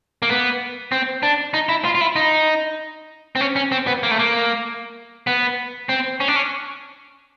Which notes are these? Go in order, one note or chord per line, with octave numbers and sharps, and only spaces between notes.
A#3
B3
C4
D4
D#4
E4
F4
F4
E4
D#4
C4
C#4
C#4
C4
B3
A#3
A3
A#3
B3
C4
C#4
D4
C#4